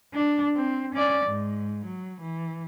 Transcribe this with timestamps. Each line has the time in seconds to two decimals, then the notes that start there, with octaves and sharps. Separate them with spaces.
0.14 D4
0.56 C4
0.95 C#4 D5
1.26 G#2
1.86 F#3
2.21 E3